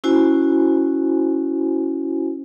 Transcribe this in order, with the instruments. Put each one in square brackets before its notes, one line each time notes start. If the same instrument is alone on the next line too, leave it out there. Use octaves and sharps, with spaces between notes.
[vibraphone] C#4 E4 F#4 C5 G#5